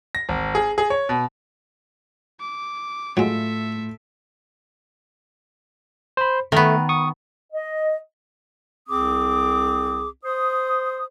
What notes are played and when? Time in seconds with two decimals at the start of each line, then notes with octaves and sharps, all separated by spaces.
0.15 A#6
0.29 G#1
0.55 G#4
0.78 G#4
0.90 C#5
1.09 B2
2.40 D6
3.17 A2 F#3 G#3 F4 A4 E5 D7
6.17 C5 B5
6.52 D#3 A3 B3
6.89 C#6 D#6
7.53 D#5
8.89 C2 C4 G#4 D6 D#6
10.24 C5 D#6